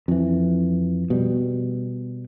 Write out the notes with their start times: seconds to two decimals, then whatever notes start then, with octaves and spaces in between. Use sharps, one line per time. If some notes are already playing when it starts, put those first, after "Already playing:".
0.08 F2 E3
1.10 B2 G3